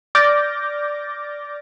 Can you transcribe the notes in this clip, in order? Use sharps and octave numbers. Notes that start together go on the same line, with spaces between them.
D5 D6 F6 G6 A6 A#6